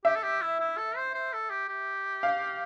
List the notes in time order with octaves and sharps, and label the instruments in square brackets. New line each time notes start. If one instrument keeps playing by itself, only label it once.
[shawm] G4 [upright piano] E5
[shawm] A4
G4
E4
E4
A4
C5
C5
A4
G4
G4
[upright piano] F5